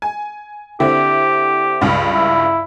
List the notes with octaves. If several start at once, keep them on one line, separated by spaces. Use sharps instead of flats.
G#5
D3 C4 E4 G4
C#2 G2
E4